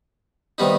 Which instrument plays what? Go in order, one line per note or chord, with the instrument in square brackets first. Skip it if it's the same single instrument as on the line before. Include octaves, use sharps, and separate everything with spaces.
[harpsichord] C3 D#3 G3 B3 D#4